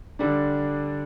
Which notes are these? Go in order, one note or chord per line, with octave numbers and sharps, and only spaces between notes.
D3 G3 D4